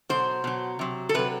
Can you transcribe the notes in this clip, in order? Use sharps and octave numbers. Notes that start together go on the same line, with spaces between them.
B2 F#3 C5
B2 F#3
C3 F#3
A4
C3 F#3 B4